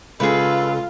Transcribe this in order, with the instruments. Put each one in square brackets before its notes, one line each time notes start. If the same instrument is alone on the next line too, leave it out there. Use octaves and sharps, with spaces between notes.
[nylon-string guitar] C#3 G#3 [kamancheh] F4 [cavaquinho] G#4 B4 [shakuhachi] A4